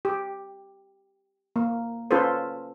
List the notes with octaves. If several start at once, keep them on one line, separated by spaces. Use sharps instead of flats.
G4
A#3
C#4 F4 A4 B4 C5